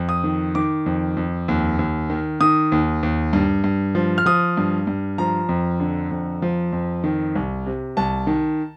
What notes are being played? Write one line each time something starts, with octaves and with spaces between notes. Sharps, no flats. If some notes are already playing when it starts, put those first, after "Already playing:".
Already playing: F2
D#6
D#3
D#3 D6
F2
F2
D#2
D#2
D#3
D#3 D#6
D#2
D#2
G2
G2
F3
F6
F3 D#6
G2
G2
F3 A#5
F2
D3
F2
F3
F2
D#3
C2
C3
C2 A5
D#3